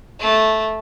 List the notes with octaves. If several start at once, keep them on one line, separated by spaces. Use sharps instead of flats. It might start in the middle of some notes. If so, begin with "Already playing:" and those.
A3